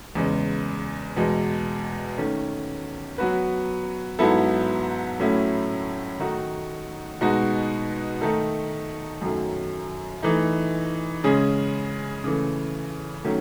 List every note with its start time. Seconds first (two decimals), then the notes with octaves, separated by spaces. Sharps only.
0.15 E2 C#3 G#3
1.17 E2 B2 G#3
2.18 D#3 A3 C#4
3.18 F#3 B3 F#4 B4
4.19 G#2 F#3 B3 E4 A4
5.19 A2 F#3 A3 C#4 E4
6.20 D#3 A3 D#4 F#4
7.21 B2 G#3 D#4 F#4
8.22 D#3 A3 D#4 A4
9.21 F#2 D#3 F#3 A3
10.23 E3 A3 D#4
11.24 C#3 G#3 C#4 G#4
12.24 C#3 E3 A3
13.24 D#3 F#3 A3 C#4